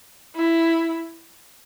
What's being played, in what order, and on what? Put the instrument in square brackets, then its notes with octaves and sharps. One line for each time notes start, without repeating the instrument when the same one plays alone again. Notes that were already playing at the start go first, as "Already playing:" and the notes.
[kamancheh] E4